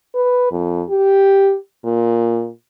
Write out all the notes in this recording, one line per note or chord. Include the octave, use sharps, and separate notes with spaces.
B4
F2
G4
A#2